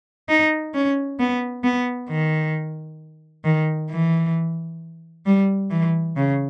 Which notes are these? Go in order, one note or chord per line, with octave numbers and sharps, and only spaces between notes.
D#4
C#4
B3
B3
D#3
D#3
E3
G3
E3
C#3